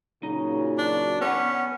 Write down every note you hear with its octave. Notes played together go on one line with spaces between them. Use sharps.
A#2 C#3 F#3 D#4
D4
B3 C#4 F#5